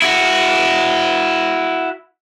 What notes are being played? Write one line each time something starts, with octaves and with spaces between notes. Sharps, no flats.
E4 F#4